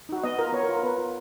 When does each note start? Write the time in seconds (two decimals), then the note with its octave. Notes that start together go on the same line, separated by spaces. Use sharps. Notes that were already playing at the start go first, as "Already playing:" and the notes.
0.09 D#4 F#4
0.24 B3 D#5
0.38 F4 A#4
0.53 B3 C#5
0.63 A#4
0.69 F4
0.76 A#4
0.83 B3 B4
0.98 F4